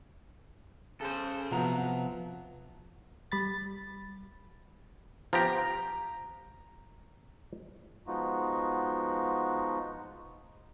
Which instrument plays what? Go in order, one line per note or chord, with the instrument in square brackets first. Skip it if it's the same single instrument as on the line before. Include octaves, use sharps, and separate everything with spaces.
[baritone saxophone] C#3 [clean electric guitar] A4 C5
[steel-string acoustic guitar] C3 B3 A#5 [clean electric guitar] F3 [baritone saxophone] F#3
[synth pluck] G3 B5 A6
[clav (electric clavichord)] F3 B3 G4 [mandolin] A#5
[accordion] F3 G#3 B3 D#4 F4 F#4